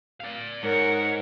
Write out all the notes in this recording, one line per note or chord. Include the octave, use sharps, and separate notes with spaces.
D5 F5
G#2 A#4 C#5 F#5